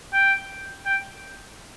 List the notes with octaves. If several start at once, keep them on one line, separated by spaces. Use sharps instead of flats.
G5
G5